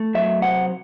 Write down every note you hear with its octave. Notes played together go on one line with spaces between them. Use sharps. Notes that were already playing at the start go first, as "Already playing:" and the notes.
Already playing: A3
F#3 E5
C3 F#5